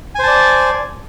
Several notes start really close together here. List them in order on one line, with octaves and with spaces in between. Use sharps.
G#5 C5 A5 D5